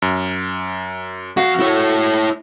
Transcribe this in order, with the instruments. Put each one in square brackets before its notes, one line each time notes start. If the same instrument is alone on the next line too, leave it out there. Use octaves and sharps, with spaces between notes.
[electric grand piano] F#2
[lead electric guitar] F2 F5 [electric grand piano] F#4
[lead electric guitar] E4 C#5